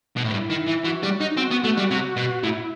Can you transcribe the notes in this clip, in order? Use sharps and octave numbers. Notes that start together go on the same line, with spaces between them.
B2
A2
G2 E4
D#3
E3
E3 F#4
G3
D#4
C4 F#4
B3
A3
G3
C3
B2
A2 E4